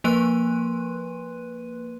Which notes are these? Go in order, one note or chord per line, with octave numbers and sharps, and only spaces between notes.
F3 A#3 B4 C6 F#6 D#7